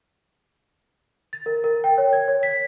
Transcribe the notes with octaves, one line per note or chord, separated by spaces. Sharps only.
A6
A#4
A#4
G5
C#5
G#6
C#5
B6